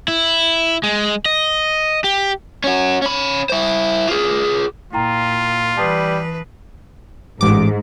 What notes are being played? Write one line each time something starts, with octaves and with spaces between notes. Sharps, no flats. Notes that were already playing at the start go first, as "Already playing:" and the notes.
E4
G#3
D#5
G4
C#4 F#4
C#4 B5
E4 C5
F4 G#4
A#2 E4 F4 G5 A#5
E3 G3 B4 A5 D#6 C7
A1 G#2 D6